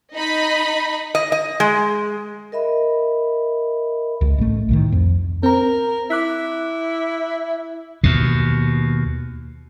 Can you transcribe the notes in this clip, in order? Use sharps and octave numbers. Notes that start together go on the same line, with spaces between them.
D#4 D#5 B5
D#5
D#5
G#3
A#4 D#5 E5 B5
C#2
A1 A3
C2 A2 D#3
F2
C4 A#4 A#5
E4 D6 F#6 B6
D#2 B2